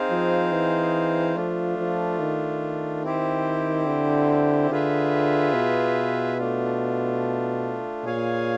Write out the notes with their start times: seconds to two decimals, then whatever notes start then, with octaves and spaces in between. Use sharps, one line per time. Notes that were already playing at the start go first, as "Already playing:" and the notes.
Already playing: C4 D#4 G#4 C5 F5
0.11 F3
0.52 E3
1.35 F3 A3 D4 F4
1.78 F3
2.19 D#3
3.03 C4 E4 G4 C5
3.87 D3
4.70 D3 F4 G#4 B4 E5
5.54 B2
6.38 A3 D4 F4
8.05 A#2 G#4 C#5 F5 G#5